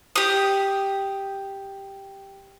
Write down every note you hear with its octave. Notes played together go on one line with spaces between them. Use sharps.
G4 D#6